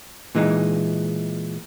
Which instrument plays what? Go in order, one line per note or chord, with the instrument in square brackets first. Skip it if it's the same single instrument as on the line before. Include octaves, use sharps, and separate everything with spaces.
[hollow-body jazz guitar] A#2 E3 G#3 D#4